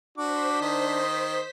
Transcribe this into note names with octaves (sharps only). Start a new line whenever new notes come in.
D4 F#4 C5 D6 B6
D#3 D#5